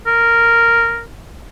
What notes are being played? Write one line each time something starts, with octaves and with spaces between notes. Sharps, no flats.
A#4